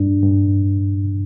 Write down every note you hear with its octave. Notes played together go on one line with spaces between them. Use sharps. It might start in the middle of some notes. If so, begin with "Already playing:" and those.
Already playing: G2 D4
G2